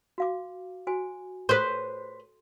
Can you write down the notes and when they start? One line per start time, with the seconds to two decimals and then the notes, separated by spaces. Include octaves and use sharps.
0.18 F#4 F5 D6
0.87 F#4 C5 G#5
1.49 A4 B4 C5 C6